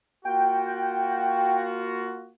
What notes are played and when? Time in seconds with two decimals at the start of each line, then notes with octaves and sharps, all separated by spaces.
0.25 A#3 F4 F#4 G5